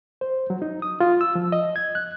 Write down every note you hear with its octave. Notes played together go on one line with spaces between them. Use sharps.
C5
F#3
D#4
D#6
F4
E6
F3
D#5
G#6
F#6